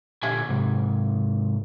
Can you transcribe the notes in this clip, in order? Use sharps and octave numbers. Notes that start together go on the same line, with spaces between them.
A#2 D3 G4 E5 G#5
G#2 C3